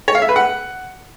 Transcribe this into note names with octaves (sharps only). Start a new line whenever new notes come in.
C#5
F5
E5
B4
F#5